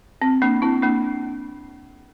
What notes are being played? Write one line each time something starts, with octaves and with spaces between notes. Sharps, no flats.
C4
A#3 D4
C4 E4
A#3 D4